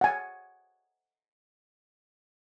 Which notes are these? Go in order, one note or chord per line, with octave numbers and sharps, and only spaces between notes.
F#5 G#5